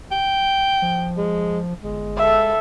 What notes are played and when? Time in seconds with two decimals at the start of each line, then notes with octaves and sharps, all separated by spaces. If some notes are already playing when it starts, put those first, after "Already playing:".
0.12 G5
0.82 F3
1.17 G#3
1.84 G1 G#3
2.17 A4 E5